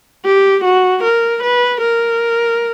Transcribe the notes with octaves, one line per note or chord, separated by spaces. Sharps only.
G4
F#4
A#4
B4
A#4